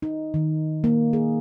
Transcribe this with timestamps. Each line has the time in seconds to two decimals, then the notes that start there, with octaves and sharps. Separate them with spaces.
0.02 D#4
0.34 D#3
0.84 A#3
1.13 G#4